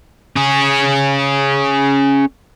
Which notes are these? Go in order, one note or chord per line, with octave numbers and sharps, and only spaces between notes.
C#4 G#4